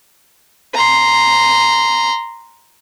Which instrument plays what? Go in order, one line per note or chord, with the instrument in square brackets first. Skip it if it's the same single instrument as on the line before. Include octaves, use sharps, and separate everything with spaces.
[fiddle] A#5 C6